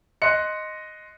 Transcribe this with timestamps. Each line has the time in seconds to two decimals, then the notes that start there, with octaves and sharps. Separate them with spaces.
0.22 D#5 C6 F#6 C#7